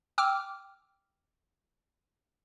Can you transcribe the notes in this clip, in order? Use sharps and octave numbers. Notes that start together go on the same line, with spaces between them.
G5 D6 E6 F6